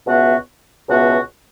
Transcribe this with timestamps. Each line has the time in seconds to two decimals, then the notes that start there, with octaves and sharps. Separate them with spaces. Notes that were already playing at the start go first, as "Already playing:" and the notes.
0.06 C#2 B2 B3 F#4 E5
0.89 C#2 B2 B3 F#4 E5